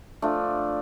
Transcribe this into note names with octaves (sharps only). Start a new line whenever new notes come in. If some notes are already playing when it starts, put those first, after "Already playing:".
F3 A3 D4